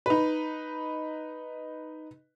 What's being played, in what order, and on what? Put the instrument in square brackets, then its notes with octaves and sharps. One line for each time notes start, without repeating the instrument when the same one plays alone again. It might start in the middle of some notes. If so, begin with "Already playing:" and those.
[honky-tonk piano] D#4 B4